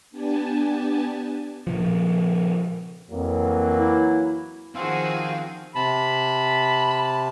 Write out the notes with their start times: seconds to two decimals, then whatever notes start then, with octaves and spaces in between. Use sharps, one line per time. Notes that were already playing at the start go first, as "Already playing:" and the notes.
0.11 B3 D4 G4 G#5 A5
1.67 A#2 C#3 F3
3.10 F2 E3 F#3 A#3
3.76 E4
4.75 D#3 F3 C4 F#4 G#4 C5 F5
5.76 C3 A5 B5